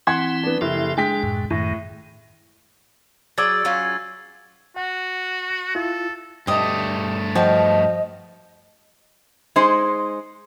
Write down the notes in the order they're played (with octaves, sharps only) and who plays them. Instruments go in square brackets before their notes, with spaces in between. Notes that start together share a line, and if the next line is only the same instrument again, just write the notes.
[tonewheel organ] E3 C4 E4 [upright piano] F#5 C6 G#6
[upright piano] B3 D4
[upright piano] F#1 E4 [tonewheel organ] F3 G4 A4
[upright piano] G#3 G5 B6 [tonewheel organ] D4
[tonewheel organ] F#2 A2
[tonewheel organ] F#2 D#3 [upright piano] A2
[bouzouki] F#3 G#4 D5 [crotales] E6 G#6 A6
[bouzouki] F#3 C#4 F4
[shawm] F#4 [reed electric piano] F#5
[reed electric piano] E4 F4 [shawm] A4
[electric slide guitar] G2 A3 [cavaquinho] G4 D#5
[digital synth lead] F3 [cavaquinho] F#4 F5 G5 [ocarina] D#5
[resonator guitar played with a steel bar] G#3 D#4 C5